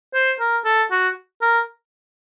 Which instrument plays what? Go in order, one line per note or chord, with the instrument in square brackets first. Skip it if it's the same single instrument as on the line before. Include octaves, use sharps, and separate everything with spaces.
[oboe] C5
A#4
A4
F#4
A#4